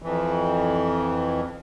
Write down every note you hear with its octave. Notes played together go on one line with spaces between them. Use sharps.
F2 E3